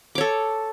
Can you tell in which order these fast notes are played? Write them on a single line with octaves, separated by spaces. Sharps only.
D6 C#5 A4